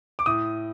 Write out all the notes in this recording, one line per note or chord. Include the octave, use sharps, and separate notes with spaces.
D6
A2 D#6